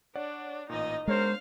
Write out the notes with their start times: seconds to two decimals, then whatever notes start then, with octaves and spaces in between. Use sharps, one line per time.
0.16 D4 C#5 D5 F#5
0.70 A1 A#2 D#4 D#5
1.08 G#3 B3 D4 A#4 C5 C#5 F5